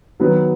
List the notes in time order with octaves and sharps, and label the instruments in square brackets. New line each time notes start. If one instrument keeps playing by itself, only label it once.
[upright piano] D#3 F#3 B3